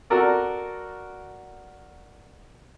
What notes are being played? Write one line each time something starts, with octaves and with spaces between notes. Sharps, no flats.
F#4 A4 A#4 D5